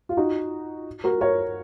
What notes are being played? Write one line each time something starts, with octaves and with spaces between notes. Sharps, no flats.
F4
D#4 F#4
F#4 A#4
A#4 C#5